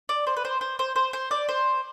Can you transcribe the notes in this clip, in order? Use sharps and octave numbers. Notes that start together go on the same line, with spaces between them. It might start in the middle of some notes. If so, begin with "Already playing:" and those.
D5
C5
B4
C5
C5
C5
C5
C5
D5
C5